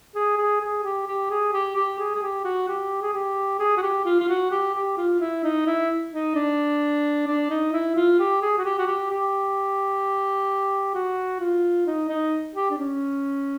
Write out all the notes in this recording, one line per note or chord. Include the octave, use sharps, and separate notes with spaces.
G#4
G#4
G#4
G4
G4
G#4
G4
G4
G#4
G#4
G4
F#4
G4
G#4
G4
G#4
F#4
G4
F4
F4
F#4
G4
G4
F4
E4
D#4
E4
D#4
D4
D4
D#4
E4
F4
G4
G#4
F#4
G4
F#4
G4
G4
F#4
F4
D#4
D#4
G4
D4
C#4